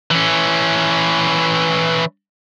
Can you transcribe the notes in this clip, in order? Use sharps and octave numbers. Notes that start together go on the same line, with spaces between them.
E3 C#4